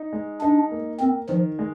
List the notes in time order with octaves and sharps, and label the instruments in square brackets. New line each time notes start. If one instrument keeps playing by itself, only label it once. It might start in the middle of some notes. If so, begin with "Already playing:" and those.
Already playing: [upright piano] D#4
G#3
[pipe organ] D4 [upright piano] D#4
[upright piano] A#3
[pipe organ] C4 [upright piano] A#4
[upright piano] D#3 [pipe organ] F3
[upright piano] G#3